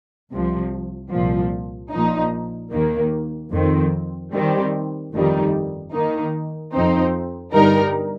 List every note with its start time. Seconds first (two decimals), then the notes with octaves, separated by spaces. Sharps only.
0.31 C2 C3 F3
1.12 C2 A#2 F3
1.91 A#1 A#2 F3 D#4
2.72 D#2 D#3 A#3
3.52 F2 D#3 C4
4.32 D#3 G3 C4 G4
5.13 G1 F2 D#3 G3 D#4
5.93 D#3 A#3 D#4
6.73 F2 F3 C4 D#4 C5
7.53 G1 G2 G3 D#4 A#4